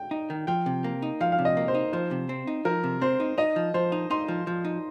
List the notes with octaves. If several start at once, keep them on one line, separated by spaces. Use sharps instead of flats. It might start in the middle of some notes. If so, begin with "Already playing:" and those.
Already playing: G5
D#4
D#3
F3 G5
C3
A#3
D#4
F3 F5
F5
C3
D#5
A#3
C5
D#4
F3 C5
C3
C4
D#4
F3 A#4
C3
C4 C5
D#4
D#4 D#5
F3
F3 C5
D#4
D#4 C6
F3
F3
D#4